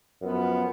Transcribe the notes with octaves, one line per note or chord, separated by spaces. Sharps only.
F#2 F3 B3